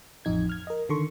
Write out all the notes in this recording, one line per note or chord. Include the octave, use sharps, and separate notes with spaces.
A1 F2 D#4 G#6
F6 G#6
A#4 D#5
D3 D#3 A4 C6 C#6